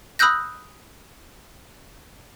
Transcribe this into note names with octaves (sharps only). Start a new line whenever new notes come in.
B5 D#6 E6 F#6 G6 A#6